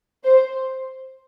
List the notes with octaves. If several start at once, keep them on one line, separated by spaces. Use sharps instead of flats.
C5